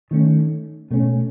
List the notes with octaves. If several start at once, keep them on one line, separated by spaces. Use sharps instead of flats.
D#3 A3 C#4
B2 A3 C#4